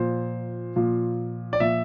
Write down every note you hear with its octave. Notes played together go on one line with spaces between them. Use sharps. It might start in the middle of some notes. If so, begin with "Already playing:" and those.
Already playing: A#2 F3 C5
A#2 F3
D5
A#2 F3 E5